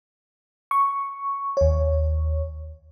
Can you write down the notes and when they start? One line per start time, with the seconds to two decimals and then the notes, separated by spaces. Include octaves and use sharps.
0.71 C#6
1.57 D#2 C#5